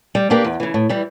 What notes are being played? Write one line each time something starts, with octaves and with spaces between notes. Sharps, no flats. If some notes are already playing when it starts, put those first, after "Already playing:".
G3
A#3 D4 G4 B4
E2
C#3 E3
A2
E3 G3